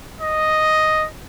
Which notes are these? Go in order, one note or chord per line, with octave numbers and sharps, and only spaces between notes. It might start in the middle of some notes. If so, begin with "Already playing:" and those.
D#5